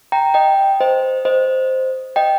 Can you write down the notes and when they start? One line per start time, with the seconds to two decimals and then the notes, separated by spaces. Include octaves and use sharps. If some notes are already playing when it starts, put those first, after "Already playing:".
0.12 G5 A#5
0.34 D#5 G5
0.81 C5 D#5
1.25 C5 D#5
2.16 D#5 G5